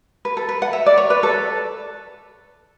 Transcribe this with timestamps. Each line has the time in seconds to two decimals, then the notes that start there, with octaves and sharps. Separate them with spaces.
0.25 B4
0.37 A4
0.49 B4
0.62 F#5
0.73 E5
0.86 D5
0.98 C#5
1.10 B4
1.23 A4